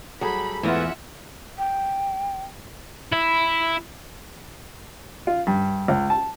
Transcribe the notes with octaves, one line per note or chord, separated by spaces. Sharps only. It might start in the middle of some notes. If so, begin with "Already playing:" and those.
F#3 G3 G#4 A4 B5
E2 G#2 A3 B3 E4 F4 E5 F#5
G5
E4
F4
G2
C#2
A5